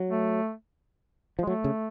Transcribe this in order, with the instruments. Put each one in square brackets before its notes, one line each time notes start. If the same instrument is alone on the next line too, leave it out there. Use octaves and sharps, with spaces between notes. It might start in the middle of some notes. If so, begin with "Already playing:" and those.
Already playing: [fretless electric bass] F#3
[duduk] A3
[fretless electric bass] F3
[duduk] G#3
[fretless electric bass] F#3 [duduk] A3
[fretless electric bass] C#3